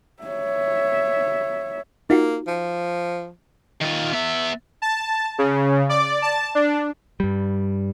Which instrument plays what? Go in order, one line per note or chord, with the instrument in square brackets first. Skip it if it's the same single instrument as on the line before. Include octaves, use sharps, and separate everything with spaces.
[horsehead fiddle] C#5 E5
[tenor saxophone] A#3 [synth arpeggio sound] D#4 F4 F#4
[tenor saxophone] F3
[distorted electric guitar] D#3 F4
B3 E5
[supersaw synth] A5
C#3
D5
A5
D4
[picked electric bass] G2 G3